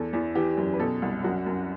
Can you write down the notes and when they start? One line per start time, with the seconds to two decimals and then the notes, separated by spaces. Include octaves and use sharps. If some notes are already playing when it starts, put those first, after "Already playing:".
Already playing: E2 A4
0.13 E2 E4
0.35 E3 G4
0.57 F#2
0.74 B4
0.79 B2 A4
1.02 C2
1.23 F#2 F#4
1.46 F#2